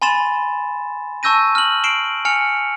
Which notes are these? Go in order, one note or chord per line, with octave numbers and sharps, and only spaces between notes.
G#5 B5 C6 A6 E7
A5 C#6 E6 G6 A#6 D#7
F6 F#7
C7 D7 E7 F#7 G7
G#5 F6 C#7 F7